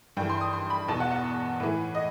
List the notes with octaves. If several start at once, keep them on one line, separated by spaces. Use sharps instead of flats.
G2 E3 G5
C6
D#6
C6
B5
E2 B2 A5
F#5
F#5
A2 E3
D#5